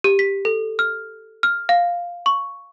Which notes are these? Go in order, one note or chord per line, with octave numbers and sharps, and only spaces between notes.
G4
B6
A4
F6
F6
F5
C#6